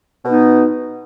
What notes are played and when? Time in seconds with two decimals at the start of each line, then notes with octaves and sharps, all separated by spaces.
0.23 B2
0.26 B3
0.30 D#4